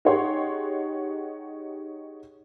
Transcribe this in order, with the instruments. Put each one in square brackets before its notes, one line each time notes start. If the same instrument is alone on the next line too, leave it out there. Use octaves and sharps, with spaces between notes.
[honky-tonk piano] D#4 G4 G#4 C#5 F#5 C6